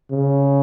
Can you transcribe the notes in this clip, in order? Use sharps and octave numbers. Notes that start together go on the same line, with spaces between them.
C#3